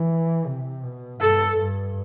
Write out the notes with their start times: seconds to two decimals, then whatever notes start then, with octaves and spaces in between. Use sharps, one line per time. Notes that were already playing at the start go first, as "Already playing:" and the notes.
Already playing: E3
0.47 C3
0.83 B2
1.21 G2 A4
1.58 G2